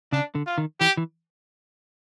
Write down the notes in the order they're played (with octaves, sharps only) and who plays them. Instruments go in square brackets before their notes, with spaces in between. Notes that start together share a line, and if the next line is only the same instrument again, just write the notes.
[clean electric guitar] C#3 [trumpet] D4
[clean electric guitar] D3
[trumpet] F4
[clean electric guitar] D#3
[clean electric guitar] E3 [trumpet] G4
[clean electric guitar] E3